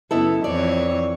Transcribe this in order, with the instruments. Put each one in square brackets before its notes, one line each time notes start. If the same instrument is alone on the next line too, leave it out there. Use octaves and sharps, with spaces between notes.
[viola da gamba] F#2 C#3 [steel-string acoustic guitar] B3 E4 A4
[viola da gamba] F2 E3 C#5 [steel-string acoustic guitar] D5